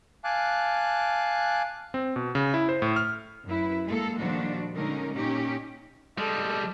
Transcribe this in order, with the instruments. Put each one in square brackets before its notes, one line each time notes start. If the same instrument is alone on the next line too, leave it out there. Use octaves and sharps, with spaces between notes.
[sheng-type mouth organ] F5 G#5 A5 D6 F#6
[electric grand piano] C4
B2
C#3
E4
C5
A2
F6
[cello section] F#2 E4 B4
G#3 A#3 A4
A#2 D#3 F3 G3 D4 F#4
D3 G#3 C#4 D#4 A#4
A#2 C#4 D#4 G4
[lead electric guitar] G3 G#3 [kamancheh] A4